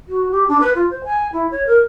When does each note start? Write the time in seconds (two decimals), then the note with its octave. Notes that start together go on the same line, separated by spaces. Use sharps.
0.09 F#4
0.32 G4
0.48 D4
0.61 B4
0.75 F4
0.91 C5
1.04 G#5
1.33 E4
1.51 C#5
1.67 A#4